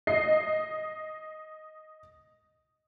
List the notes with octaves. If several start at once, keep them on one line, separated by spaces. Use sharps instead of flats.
D#5 C7